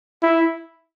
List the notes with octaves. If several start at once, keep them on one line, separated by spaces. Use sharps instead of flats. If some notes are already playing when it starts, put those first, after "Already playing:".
E4